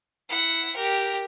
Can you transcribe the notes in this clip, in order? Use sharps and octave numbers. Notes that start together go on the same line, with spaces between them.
E4 F#5
G4 A#4